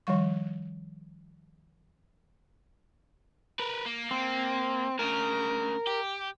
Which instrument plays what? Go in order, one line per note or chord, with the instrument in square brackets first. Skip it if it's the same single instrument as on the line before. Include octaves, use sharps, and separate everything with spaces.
[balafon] D#3 F3 G3 C#6
[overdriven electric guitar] A#4 B4
A#3
[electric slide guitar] C4
[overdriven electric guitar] D2 C#3 [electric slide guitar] A#4
[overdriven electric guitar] G4